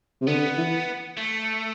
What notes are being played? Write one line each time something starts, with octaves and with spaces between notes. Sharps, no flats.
C3
D3 B3
E3
A3